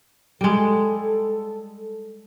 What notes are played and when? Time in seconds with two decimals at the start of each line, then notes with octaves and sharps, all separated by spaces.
0.41 G3 G#3 A4